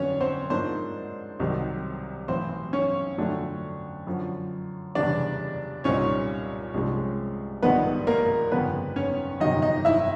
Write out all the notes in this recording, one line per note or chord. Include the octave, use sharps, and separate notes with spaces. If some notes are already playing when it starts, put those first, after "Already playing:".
Already playing: F2 D3 F#3 B3 C#4 D4 C#5
C4 C5
G#2 F3 A#3 C4 D4 C5
C2 C3 D#3 F#3
B1 A2 E3 C4 C5
C#4 C#5
F2 D3 F#3 A3 D4
F#2 D3 F3
F1 E2 C#3 E3 G3 D4 D5
C2 A#2 G3 C4 C#4 D#4 C#5
C2 C3 F3 G#3 C#4
A#1 G#2 D#3 G3 B3 B4
A#3 A#4
G1 F2 C#3 B3 B4
C#4 C#5
G1 F2 C3 D#3 F#3 D#4 D#5
D#4 D#5
E4 E5